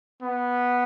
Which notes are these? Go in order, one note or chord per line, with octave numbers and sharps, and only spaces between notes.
B3